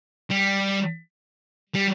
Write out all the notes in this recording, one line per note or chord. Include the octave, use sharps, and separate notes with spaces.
G3
G3